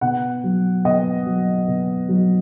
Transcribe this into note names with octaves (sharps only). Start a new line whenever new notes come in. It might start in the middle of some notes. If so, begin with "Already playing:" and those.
B2 F#5
F#3
B2 D#5
F#3
B2
F#3